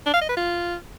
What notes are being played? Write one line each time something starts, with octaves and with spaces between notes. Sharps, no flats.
D4
F5
D#5
B4
F4